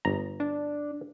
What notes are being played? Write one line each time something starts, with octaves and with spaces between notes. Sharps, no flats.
G1 A#5
D4